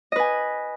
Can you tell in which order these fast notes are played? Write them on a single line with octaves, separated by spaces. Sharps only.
D#5 B4 G#5